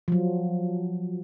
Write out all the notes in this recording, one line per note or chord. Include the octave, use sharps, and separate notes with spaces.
F3 F#3